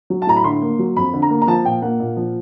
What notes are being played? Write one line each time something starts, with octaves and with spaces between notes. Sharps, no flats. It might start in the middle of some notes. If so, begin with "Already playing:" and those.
F#3
A5
A2 A#5
B5
D3 C6
A#3
F#3
F2 B5
D3
A#5
A#3
A#5
F3 A5
A#2 G5
A#3 F#5
A#2
F3